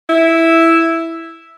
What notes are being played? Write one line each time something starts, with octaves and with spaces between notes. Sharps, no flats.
E4